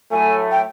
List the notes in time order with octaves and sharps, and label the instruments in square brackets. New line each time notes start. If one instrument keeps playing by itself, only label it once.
[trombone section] A2 F#3 A3 [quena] G#5
[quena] G5